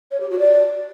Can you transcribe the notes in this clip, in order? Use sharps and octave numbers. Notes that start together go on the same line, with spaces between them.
C#5
G4
F#4
D5